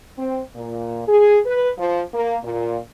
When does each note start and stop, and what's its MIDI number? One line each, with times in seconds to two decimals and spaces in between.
0.18 0.41 60
0.56 1.03 46
1.07 1.40 68
1.45 1.69 71
1.78 2.02 53
2.14 2.37 58
2.44 2.78 46